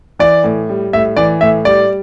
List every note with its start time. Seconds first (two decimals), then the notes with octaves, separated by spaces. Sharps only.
0.19 E3 D5
0.44 A2
0.69 G3
0.93 A2 E5
1.17 E3 D5
1.41 A2 E5
1.65 G3 D5